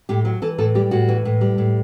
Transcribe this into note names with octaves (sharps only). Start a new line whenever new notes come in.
A2 G4
F#3
E3 A4
A2 A4
G3 G4
A2 F#4
E3
A2
G3
A2